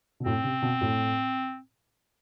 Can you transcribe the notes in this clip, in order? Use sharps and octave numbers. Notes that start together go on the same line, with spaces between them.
B2
A2 C4
C3
B2
A2